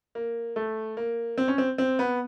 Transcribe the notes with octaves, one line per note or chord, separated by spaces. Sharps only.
A#3
A3
A#3
C4
C#4
C4
C4
B3